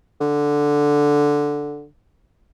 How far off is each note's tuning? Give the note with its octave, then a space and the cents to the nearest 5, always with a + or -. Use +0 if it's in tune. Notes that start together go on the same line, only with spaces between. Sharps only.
D3 +0